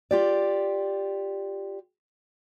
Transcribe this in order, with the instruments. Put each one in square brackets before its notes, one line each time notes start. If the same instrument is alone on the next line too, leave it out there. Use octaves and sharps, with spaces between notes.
[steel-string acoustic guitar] F4 G4 D5